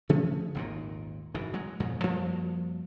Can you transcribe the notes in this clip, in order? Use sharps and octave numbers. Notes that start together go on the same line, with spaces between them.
C#3 F3 A3 C#4
G#1 D#2 A#2
F#1 G#2 E3
F#3 G#3
F2 G#2 B2 F#3
F#2 F3 G3 A#3